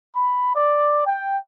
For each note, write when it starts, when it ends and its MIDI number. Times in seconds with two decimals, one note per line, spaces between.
0.15 0.53 83
0.55 1.02 74
1.04 1.38 79